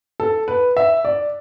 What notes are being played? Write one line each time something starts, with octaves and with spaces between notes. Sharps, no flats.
A4
B4
E5
D5